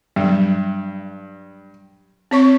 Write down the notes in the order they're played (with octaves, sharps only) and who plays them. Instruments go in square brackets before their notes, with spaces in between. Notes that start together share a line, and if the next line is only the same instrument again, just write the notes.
[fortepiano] G2 [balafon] F#3
[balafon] C4 C#5 C#6